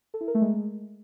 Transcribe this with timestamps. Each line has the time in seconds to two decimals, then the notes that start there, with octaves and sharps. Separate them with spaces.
0.14 A4
0.21 E4
0.28 A#4
0.35 A3
0.42 G#3